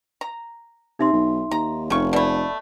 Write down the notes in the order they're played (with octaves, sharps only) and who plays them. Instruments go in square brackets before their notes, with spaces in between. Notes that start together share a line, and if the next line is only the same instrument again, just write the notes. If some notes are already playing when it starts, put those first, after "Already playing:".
[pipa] A#5
[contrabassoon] C3 [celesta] D#4 E5 C6
[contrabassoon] B1
[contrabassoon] D#2 [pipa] A#5
[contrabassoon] F1 [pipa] C#3 C#6
[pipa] B2 A3 [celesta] D5 B5